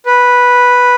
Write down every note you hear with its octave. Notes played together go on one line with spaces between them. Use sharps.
B4